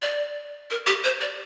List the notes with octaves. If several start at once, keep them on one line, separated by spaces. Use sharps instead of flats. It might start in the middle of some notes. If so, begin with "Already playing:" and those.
D5
A#4
G4
C5
D5